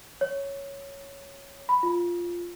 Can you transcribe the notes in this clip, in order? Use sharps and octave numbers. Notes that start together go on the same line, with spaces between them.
C#5
B5
F4